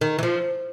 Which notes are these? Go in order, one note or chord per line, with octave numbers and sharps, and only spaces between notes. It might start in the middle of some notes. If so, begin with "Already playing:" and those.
D#3
E3
F3